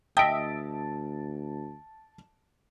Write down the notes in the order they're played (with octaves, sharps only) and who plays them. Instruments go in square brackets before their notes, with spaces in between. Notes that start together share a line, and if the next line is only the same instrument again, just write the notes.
[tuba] D2 [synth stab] D#5 E5 [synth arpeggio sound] G5 [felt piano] A5 D7